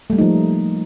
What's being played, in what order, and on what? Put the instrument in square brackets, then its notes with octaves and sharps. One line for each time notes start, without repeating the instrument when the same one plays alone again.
[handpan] A3
G3
A#3
D#4
F3